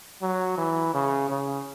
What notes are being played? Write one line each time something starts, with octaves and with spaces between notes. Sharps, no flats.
F#3
E3
C#3
C#3